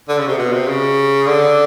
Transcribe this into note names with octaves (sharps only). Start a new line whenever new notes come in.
D3
C#3
C3
B2
C3
C#3
D3